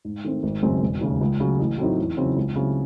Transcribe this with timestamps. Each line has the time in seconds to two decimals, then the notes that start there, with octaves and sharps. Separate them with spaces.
0.05 G#2
0.24 D#3 A3 C4
0.43 G#1
0.62 F#2 C#3 G#3 C4
0.82 E1
1.01 D#2 C#3
1.21 C#2
1.40 C#3 F#3
1.59 A1
1.78 A2 F#3 C4 D#4
1.98 E2
2.17 C#3 F#3 C4 D#4
2.36 C#2
2.56 C#3 F#3 C4 E4